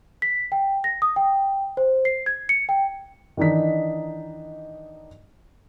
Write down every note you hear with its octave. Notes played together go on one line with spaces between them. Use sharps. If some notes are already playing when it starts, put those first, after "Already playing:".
B6
G5
A#6
D#6
G5
C5
C7
G#6
C#7
G5
D#3 E3 D4 D#4 B6